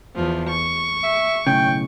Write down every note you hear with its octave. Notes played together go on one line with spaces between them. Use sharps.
E2 F3
C#6
E5
B1 A2 C#3 G5